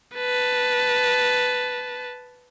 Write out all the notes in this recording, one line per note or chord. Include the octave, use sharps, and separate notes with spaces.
B4 A5